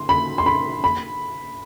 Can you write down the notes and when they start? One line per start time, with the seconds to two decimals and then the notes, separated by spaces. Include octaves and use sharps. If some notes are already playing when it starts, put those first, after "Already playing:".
Already playing: C6
0.09 B5
0.38 C6
0.46 B5
0.84 B5